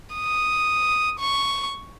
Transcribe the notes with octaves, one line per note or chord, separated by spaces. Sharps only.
D#6
C#6